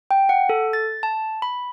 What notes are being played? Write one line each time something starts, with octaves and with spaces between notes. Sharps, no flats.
G5
F#5
A4
A6
A5
B5